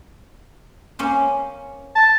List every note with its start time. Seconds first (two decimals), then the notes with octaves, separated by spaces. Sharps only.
0.99 A#3 C#4 C5
1.95 A5